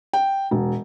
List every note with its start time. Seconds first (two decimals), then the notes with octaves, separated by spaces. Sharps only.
0.13 G5
0.51 E1